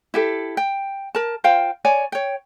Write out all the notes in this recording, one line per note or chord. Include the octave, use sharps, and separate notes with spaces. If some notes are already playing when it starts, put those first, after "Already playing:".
E4 G4 A4
G5
A#4 A5
F4 C5 F5 G5
C#5 D5 G#5
C#5 G5